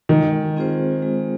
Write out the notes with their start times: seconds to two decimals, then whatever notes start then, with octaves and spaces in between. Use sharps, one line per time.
0.09 D#3 G#3
0.56 C4 F4 G#4 C5
1.02 G#3